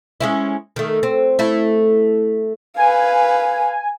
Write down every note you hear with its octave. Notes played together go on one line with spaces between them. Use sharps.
G#3 C#4 E4
D#3 A3
C4
A3 E4
B4 F5 G#5